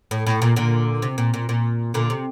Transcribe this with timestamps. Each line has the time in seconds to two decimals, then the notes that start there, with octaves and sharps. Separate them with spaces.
0.11 A2
0.27 A2
0.42 A#2
0.56 A#2 D3
1.02 C3
1.18 A#2
1.34 A#2
1.49 A#2
1.94 A#2 D3
2.10 C3